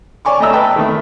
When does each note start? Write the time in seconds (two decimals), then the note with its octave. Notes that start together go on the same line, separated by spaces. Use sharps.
0.25 C#5 D5 G#5 C#6 D6
0.40 A3 D#5 A#5 E6
0.53 B4 G5 A5
0.76 D#3 A3